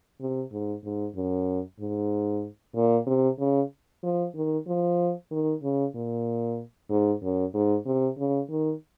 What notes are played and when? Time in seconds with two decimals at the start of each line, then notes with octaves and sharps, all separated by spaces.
0.21 C3
0.52 G#2
0.84 G#2
1.15 F#2
1.80 G#2
2.76 A#2
3.07 C3
3.39 C#3
4.03 F3
4.35 D#3
4.67 F3
5.31 D#3
5.63 C#3
5.95 A#2
6.90 G#2
7.23 F#2
7.54 G#2
7.86 C3
8.18 C#3
8.50 D#3